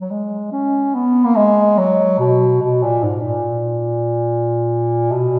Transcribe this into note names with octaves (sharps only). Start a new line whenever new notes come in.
F#3
G#3
C#4
B3
A#3
G#3
F#3
B2
B2
A#2
G#2
A#2
B2